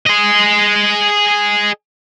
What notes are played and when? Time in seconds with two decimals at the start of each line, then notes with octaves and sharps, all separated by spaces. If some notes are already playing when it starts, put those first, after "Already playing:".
0.07 G#4 D#5